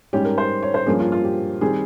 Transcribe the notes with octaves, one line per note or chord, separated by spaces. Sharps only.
G#2 G3 C#4 G4
A#4
C5
C#5
C5
G2 F3 A#3 C#4 G#4
F4
F4
G4
D#3 G3 C4 G#4